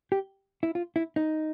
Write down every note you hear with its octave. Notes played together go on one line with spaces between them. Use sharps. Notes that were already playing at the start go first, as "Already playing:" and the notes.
G4
E4
F4
E4
D#4